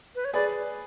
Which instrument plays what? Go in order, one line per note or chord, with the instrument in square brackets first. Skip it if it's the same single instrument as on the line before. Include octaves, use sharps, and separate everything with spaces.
[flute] B4
C#5
[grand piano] G#4 B4 [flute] D5